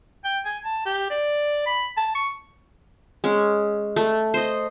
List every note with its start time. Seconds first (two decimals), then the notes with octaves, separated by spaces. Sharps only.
0.25 G5
0.46 G#5
0.65 A5
0.86 G4
1.10 D5
1.66 B5
1.97 A5
2.15 C#6
3.24 G#3 C#4
3.96 A3
4.34 C5 D#5